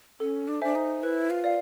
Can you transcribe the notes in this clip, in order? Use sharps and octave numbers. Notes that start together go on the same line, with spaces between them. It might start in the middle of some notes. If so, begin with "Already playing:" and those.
C#4 A4
D4
D4 C5 E5 G#5
D#4
E4 B4
F4
D5 F5